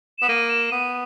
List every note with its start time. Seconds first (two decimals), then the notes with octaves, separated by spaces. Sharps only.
0.19 B3 E7
0.29 A#3 D#7
0.50 E7
0.71 B3 D#7